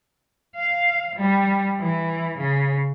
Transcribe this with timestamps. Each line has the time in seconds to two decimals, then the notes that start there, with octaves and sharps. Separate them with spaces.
0.56 F5
1.16 G3
1.80 E3
2.38 C#3